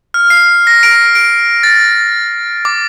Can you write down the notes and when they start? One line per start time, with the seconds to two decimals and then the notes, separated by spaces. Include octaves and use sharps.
0.14 F6
0.30 C7
0.67 A#6
0.83 D7
1.15 D7
1.63 A6
2.65 D6